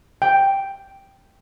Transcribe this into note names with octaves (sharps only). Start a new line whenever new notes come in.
G5